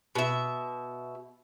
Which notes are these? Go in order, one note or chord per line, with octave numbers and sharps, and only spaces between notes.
B2 E5